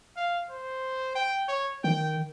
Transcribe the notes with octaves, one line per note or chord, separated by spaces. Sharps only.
F5
C5
G5
C#5
D#3 G5